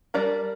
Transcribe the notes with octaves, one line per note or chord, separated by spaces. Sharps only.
G3 D4 A#4 D5